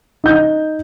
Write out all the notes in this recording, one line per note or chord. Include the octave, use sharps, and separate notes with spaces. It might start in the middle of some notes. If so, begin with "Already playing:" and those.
D#4 G6